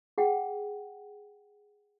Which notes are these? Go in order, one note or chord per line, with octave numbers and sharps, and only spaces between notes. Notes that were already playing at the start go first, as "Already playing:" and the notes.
G#4 F#5 G5